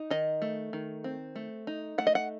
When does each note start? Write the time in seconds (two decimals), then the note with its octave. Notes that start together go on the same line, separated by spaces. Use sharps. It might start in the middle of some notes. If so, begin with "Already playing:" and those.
Already playing: D#4
0.10 D#3 D#5
0.42 A3
0.73 D#3
1.04 C4
1.36 A3
1.67 D#4
1.98 A3 F#5
2.07 D#5
2.15 F#5